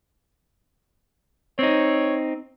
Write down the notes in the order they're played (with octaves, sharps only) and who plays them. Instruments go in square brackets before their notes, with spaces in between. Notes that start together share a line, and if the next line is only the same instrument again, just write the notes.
[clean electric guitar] C4 D#4 [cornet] C#5